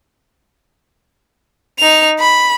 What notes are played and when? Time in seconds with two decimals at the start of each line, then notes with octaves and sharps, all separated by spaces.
1.79 D#4 F7
2.20 B5